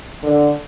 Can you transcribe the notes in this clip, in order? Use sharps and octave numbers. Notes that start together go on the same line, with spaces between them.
D3